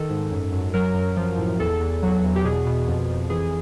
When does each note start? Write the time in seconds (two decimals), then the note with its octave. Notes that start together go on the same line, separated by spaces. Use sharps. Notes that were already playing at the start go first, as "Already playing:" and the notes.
Already playing: D#3 A4
0.10 G#2
0.31 F#2
0.52 F#2
0.74 F#3 A#4
0.95 F#2
1.17 F3
1.38 A2
1.60 E2 A4
1.80 E2
2.03 F#3
2.24 E2
2.36 G4
2.44 B2 G#4
2.66 B2
2.88 F2
3.10 F2
3.30 E3 G#4